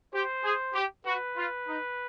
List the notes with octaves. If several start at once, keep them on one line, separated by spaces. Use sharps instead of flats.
G4 C5
G#4
G4
F#4 B4
F4
D#4